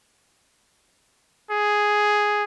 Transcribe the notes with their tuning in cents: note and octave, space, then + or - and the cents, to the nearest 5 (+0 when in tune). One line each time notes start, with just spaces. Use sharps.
G#4 +5